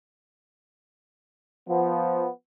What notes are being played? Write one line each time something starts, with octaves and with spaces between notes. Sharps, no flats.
F3 B3